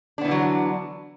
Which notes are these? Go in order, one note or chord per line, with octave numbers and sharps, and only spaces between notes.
D3 E3 F#3 B3 D4